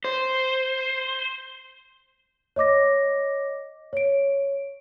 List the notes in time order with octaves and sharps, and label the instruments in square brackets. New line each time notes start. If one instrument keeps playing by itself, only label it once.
[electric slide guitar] C5
[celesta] C#5 D#5 D6 A#6
C#5 D7